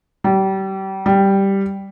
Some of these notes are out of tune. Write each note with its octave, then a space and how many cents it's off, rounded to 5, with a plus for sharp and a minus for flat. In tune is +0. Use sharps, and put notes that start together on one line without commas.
G3 -30
G3 +0